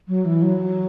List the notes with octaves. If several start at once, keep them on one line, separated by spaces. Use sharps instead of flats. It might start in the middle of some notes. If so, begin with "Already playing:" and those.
F#3
E3
F#3